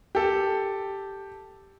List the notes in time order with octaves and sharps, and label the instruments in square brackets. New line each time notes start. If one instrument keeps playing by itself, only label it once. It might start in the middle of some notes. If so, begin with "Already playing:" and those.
[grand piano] G4 A4